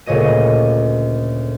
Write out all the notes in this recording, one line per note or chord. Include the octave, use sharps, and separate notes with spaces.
D2 A#2 C#3 C#5 D#5 D#7